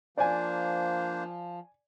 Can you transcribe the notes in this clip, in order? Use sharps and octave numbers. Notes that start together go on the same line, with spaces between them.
F3 A#3 D4 C5 D5 G#5